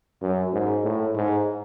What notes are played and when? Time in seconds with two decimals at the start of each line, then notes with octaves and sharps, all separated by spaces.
0.22 F#2
0.53 G#2
0.84 A2
1.16 G#2